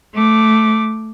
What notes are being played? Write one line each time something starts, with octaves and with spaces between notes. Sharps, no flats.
A3 D6